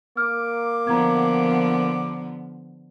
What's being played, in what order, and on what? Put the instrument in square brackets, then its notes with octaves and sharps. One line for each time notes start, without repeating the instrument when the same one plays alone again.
[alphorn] A#3 [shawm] D6 [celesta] F6
[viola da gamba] D3 F3 B3 [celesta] A#5 G#6